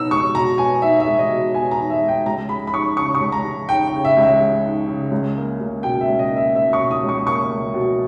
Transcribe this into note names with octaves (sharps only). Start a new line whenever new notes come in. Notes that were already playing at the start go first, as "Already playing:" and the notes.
Already playing: B2 B3 D#4 E6
G#3 C#6
B2 A#5
B3 G#5
D#4 E5
E5
G#3
D#5
B2
B3 G#5
A#5
D#4
E5
G#3
G5
C#2 A#5
G#3 B5
B5
D#4 C#6
C#3 C#6
C#6
C#2
A#5
G#3
D#4 G5
G5
C#3
E5
C#2
E5
G#3
D#4
C#3
C#2
A#3
C#2
B2 G5
E5
C#2
D#5
A#3
E5
C#2 E5
C#6
B2
D#6
C#2
C#6
A#3 C#6
C#2
B2